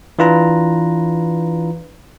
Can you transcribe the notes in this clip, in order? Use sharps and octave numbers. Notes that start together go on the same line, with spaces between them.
E3 D4 F4 B4 A#5